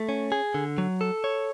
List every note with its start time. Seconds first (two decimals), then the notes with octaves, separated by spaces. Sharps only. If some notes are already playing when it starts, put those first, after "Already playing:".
Already playing: A3
0.09 C#4
0.32 G#4
0.54 D3
0.78 F#3
1.01 A4
1.24 C#5